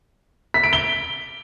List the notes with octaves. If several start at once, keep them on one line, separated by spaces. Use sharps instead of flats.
B6
D7
G7